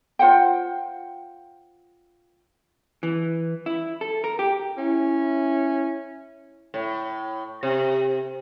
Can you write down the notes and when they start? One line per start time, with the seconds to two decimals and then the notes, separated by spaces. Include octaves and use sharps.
0.19 F4 C5 F#5 G5
3.03 E3
3.66 E4
4.01 A4
4.24 A#4
4.39 G4
4.78 C#4 E4
6.74 A2
7.63 C3